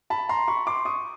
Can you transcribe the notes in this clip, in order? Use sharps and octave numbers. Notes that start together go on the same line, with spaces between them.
A5 B5
A#5 C6
B5 C#6
C6 D6
C#6 D#6